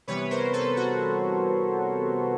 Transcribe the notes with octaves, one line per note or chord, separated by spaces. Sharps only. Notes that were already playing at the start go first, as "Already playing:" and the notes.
C3 E3 G3 B3 B4 C#5
A#4 C5
A4 B4
F#4